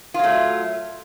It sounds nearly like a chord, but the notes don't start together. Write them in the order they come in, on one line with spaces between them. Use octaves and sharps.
F4 F#3 A3